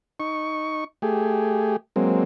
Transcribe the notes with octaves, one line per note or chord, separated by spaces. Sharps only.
D#4 C#6
A3 G4 G#4
F#3 G#3 A#3 C4